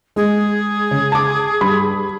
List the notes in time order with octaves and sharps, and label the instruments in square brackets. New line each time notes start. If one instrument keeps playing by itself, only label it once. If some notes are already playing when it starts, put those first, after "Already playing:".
[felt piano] G#3 [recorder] G#4
[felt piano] C#3
A5 D6
G2 B5